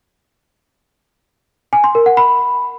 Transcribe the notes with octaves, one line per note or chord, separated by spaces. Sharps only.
G#5
C6
A#4
F#5
B5